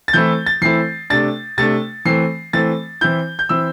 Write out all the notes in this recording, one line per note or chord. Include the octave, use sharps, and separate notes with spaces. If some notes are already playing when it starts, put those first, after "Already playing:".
A6
E3 A3 C4 E4 G6
A6
E3 A3 C4 E4 C7
C3 A3 D4 A6
C3 A3 D4 A6
E3 A3 C4 C7
E3 A3 C4 A6
E3 C4 E4 G6
G6
E3 C4 E4 E6